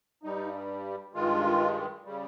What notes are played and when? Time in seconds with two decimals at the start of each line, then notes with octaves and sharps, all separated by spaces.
0.23 G2 G3 D#4
1.14 G2 D#3 G#3 F4
2.05 C#3 G3